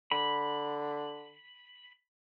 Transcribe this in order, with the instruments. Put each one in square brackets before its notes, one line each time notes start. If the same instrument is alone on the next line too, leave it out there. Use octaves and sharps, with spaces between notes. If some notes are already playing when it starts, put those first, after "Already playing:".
[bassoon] D3 [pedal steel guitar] B5